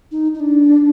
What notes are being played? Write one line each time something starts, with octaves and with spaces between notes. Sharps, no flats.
D#4
D#4
D4